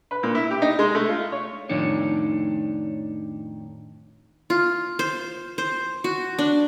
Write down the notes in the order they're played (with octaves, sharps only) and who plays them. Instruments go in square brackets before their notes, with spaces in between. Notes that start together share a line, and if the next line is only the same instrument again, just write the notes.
[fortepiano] B4
A#2
E4
G4
D#4
G#3
A3
F4
C#5
[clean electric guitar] F2 A2 D#3 D4 C#5
[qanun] F4
C5
C5
F#4
D4